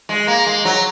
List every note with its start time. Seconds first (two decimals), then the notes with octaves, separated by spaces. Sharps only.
0.09 G#3
0.27 A#3
0.46 G#3
0.65 F#3